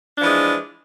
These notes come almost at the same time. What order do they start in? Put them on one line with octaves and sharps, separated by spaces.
D4 F3 E3 G#3